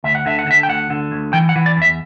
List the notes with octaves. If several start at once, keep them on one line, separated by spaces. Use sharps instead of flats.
D2 E5
F#5
D3 E5
F#5
D3 E5
G5
D2 F#5
D3
D2
E3 G5
F#5
E3
D5
E2 E5